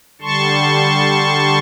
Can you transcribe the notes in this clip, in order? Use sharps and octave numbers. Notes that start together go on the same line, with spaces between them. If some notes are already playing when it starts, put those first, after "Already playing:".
D3 G3 A5 C6 C#6